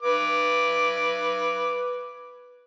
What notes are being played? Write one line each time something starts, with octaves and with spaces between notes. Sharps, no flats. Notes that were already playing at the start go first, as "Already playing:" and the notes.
B4 D6